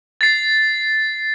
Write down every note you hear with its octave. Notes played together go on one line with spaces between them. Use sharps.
A6 C7